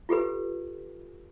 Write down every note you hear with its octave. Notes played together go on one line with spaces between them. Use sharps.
F4 G4 A4 B4